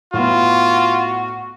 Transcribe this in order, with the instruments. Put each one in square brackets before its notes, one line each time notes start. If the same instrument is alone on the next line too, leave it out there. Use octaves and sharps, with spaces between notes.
[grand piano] A2 B3 [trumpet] F4 [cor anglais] F#4